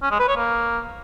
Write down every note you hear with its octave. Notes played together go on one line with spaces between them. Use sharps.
C#4
G#3
B4
C#5
A#3